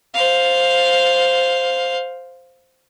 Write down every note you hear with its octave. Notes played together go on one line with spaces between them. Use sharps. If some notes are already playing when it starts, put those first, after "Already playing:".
C5 F5